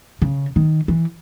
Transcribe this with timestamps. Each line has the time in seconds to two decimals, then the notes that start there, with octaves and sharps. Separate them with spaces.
0.22 C#3
0.56 D#3
0.88 E3